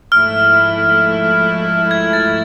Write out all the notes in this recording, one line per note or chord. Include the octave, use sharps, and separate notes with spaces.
G#2 F3 A3 E4 F6
G#6
A6